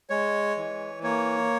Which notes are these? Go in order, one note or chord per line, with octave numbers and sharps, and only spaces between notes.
G#3 C#5
E3
A#3 C#5